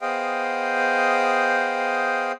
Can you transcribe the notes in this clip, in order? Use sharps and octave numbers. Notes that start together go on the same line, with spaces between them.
B3 G#4 C5 D#5 F5 G5